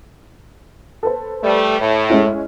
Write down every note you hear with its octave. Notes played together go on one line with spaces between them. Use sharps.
A4 B4 C5
G3 A3
A2
G#3 C#4 E4